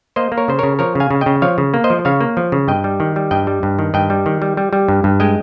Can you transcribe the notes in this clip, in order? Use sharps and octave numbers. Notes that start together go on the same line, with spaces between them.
A#3 C5 D#5
A#3
A#4 C#5
C#3 C5
C#3 A#4 C#5
F3 A#4 C#5
C#3 F5 G#5
C#3
D#5 G5
C#3
F3 C#5 F5
C#3
A#3
C5 D#5
F3
C#3 C#5 F5
A#3
F3
C#3
G2 D#5 G5
G3
D#3
G3
G2 D#5 G5
G3
G2
D#3
G2 D#5 G5
G3
D#3
G3
G3
G3
G2
G2
G#3 D#5 G5